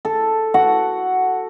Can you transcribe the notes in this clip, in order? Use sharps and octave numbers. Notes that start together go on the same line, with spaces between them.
A4
F#4 F#5